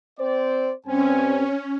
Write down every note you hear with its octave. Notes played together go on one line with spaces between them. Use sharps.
C4 C5 D5
G2 C4 C#4 G#5